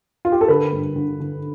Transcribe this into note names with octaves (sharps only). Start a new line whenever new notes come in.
F4
G4
A4
D3 B4
G2
D3
D3